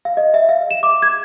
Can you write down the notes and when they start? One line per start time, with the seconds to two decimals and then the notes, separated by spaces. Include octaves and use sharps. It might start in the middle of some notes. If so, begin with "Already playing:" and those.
0.05 F5
0.17 D#5
0.34 E5
0.49 F5
0.71 E7
0.83 D6
1.02 G#6